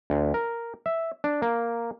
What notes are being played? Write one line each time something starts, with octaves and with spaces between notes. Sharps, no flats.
D2
A#4
E5
D4
A#3